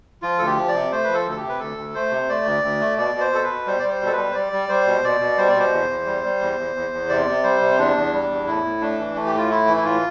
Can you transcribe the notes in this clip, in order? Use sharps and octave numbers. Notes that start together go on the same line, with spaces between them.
F3 F4
D2 A4
G4
F3
D5
C3
A3 C5
F3 B4
A4
D2
A4
G4
C3
B4
D2 A4
D2
A3 C5
C3
A3 D5
D2
D2
A3
B2 D5
B2
C5
B2 A4
B4
B2
G3 C5
G3 D5
C5
B2
A4
B4
G3
C5
G3 D5
G3
G3 C5
B2
B2 D5
B2
G3 C5
D5
B2
C5
E2
E2
G3
G3
E2
E2
E2
E2
C3 D5
C3
G3 C5
C3
E2 D4
E2
G3
E2
A2 E4
A2
A3 D4
E3
A3
G4
A2 F4
A3 E4
E3
E4
A2 F4